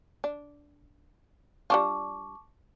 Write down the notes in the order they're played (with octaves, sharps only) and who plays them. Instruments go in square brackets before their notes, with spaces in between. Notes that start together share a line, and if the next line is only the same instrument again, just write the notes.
[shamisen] D4
[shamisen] G3 D4 F4 [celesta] A5 C#6 D6